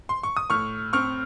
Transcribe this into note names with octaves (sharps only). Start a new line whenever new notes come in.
C6
C#6
D#6
A2 C#6 F6
C4 C#6 F6